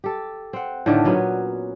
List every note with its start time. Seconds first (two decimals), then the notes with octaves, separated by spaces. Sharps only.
0.04 G4 A4
0.53 C4 F#5
0.86 A2 D3 D#3 A3
1.04 A#2 F#3 B3 C#4